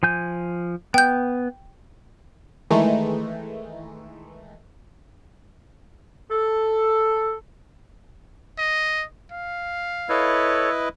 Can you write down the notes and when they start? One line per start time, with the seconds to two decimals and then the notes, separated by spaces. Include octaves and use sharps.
0.03 F3 G#5 G6
0.94 B3 G5 G6
2.70 D#3 E3 G#3 A3 D#4
6.31 A4
8.58 D#5
9.32 F5
10.09 E4 A4 B4 C#5 D#5